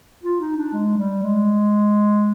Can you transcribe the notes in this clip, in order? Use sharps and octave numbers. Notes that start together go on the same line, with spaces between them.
F4
D#4
D4
G#3
G3
G#3